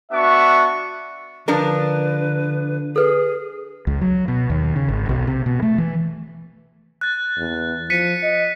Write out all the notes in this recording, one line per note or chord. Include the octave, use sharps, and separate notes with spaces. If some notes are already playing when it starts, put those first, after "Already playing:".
B3 D4 F#4 E5 C#6
D3 F3 D4 A#4 B4
G#4 A4 B4
C#2
F#3
B2
D#2
C#3
G#1
B1
C3
B2
A3
E3
F#6 A6
E2
F3 B6 C#7 D#7
D#5